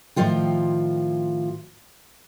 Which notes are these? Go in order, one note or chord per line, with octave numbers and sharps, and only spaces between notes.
A2 D#3 F3 F4 G5